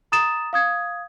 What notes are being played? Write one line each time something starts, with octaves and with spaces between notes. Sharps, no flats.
A#5 D#6 A6 E7
F5 D#6 G#6